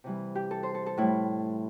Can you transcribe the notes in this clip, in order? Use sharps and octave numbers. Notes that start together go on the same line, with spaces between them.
C3 E3 G3
G4
A4
C5
A4
A4
A2 G3 E4